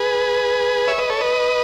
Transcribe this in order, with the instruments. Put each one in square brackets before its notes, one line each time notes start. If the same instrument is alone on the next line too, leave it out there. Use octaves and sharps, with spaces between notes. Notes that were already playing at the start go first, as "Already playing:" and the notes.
Already playing: [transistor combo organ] G#4 B4
C#5 E5
B4 D#5
A4 C#5
B4 D#5